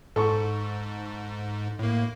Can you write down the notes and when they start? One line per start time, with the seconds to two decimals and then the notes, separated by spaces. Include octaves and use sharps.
0.16 G#2 A4 C#6
1.79 A2 A#3